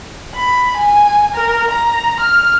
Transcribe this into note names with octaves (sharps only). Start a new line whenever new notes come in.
B5
G#5
A#4
A#5
F6